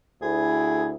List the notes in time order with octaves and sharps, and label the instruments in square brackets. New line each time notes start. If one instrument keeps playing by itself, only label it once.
[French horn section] D2 E4 [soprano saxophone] G#4